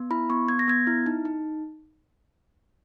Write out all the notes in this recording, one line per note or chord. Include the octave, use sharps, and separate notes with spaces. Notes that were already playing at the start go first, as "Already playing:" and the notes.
Already playing: B3
E4 B5
B3 C#6
B3 G#6
A#6
B3 G#6
E4
D#4
D#4